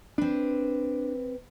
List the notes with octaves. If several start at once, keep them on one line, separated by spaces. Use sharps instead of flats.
C4 D4 B4